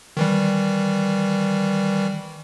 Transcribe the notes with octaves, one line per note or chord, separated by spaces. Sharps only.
D#3 E3 G3